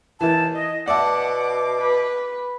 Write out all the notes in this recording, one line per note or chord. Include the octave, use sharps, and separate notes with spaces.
D#2 E3 E4 A5
D#5
B2 D5 E5 F#5 A5 D6
B4